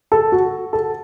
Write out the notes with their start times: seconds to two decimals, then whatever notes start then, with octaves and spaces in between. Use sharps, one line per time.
0.12 A4
0.32 F#4
0.73 A4